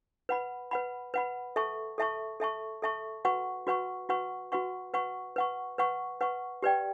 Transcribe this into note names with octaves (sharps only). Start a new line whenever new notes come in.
B4 F#5 B5
B4 F#5 B5
B4 F#5 B5
A4 E5 A5 C#6
A4 E5 A5 C#6
A4 E5 A5 C#6
A4 E5 A5 C#6
F#4 B4 F#5 C#6
F#4 B4 F#5 C#6
F#4 B4 F#5 C#6
F#4 B4 F#5 C#6
B4 F#5 C#6
B4 F#5 C#6
B4 F#5 C#6
B4 F#5 C#6
G4 B4 D5 G5